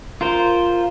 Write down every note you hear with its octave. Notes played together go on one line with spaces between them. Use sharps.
F4 A#4 C5